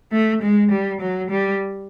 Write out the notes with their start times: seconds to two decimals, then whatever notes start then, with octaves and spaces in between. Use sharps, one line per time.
0.12 A3
0.42 G#3
0.71 G3
1.01 F#3
1.31 G3